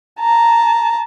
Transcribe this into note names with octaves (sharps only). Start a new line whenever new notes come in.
A5 A#5